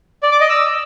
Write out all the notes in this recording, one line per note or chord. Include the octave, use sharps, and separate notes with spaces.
D5
D6
D#5
E6